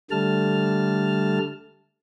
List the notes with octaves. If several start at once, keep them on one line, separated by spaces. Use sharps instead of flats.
D3 G3 A3 A5 F6